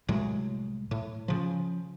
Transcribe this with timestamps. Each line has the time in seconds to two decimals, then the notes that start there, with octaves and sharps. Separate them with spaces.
0.09 C2 A2 F#3 G#3
0.91 A2
1.28 C#3 F3